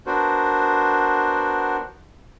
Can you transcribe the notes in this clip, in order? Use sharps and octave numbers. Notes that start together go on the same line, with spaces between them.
B3 D4 F#4 A#4 C5